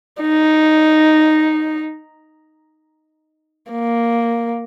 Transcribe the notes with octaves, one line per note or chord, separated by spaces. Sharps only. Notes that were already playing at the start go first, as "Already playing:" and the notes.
D#4
A#3